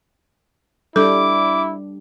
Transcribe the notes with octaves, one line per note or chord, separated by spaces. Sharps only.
G3 D4 E4 A4 D6